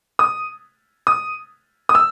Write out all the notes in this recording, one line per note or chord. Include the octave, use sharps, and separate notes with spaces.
D#6
D#6
D#6
E6